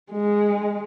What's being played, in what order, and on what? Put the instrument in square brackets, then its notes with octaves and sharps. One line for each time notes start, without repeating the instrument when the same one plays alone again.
[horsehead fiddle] G#3